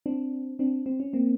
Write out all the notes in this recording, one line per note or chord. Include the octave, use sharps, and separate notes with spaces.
C4 D4
C4 D4
C4
C#4
A#3 C4